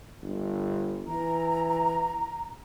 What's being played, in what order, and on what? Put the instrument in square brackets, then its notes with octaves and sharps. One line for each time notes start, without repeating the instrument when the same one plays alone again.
[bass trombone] G1
[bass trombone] E3 [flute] A#5